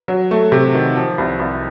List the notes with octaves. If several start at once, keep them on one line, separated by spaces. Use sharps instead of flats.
F#3
A3
C3
D#3
F3
C2
C2